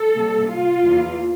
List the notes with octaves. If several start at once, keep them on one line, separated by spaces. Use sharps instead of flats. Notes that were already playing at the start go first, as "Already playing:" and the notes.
Already playing: A4
C3 G3 A#3
F4
E2 E3 A#3